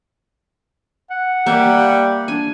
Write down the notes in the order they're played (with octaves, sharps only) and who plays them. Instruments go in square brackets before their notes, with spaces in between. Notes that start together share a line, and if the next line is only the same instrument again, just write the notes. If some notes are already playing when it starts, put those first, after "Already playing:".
[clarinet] F#5
[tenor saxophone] G3 [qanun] A#3 E5
[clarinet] D4 [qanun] G#5